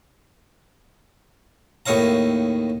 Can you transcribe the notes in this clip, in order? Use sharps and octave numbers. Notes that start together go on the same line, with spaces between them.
D#2 A2 D#4 C#5 F5 A#5